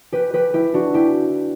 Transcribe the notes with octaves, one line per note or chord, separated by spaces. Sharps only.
G4 B4
G4 B4
E4 G4
D4 F#4
E4 G4